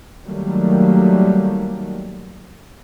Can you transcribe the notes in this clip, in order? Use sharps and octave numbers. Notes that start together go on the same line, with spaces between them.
D#3 F#3 G3 A3 A#3